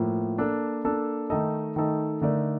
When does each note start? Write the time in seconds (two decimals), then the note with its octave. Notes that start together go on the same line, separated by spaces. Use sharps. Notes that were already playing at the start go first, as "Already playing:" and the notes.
Already playing: A2 F3 A#3
0.38 A#3 D4 A4
0.84 A#3 D4 A4
1.30 D#3 A3 D#4 A4 D#5
1.76 D#3 A3 D#4 A4 D#5
2.21 D3 A3 D#4 A#4 D5